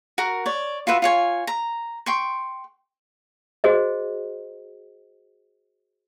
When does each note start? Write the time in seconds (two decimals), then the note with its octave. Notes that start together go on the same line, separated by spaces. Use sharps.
0.18 F#4 A#4
0.46 C#5 D5
0.87 F4 F#4 B4 E5
1.02 F4 C#5 G#5
1.47 A#5
2.06 G5 C6 C#6
3.64 F#4 G#4 C5 D#5